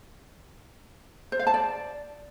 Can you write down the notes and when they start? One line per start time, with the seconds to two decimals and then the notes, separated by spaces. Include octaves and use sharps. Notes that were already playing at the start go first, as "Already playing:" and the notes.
1.32 C5
1.39 F5
1.47 A5
1.54 D5